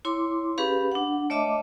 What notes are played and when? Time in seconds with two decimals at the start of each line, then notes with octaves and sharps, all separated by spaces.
0.05 E4 C#5 C6 D6
0.58 C#4 G4 G#4 B4 F5 B5
0.92 D4 F#5
1.30 A3 C#5 D#5 E5 A5 D6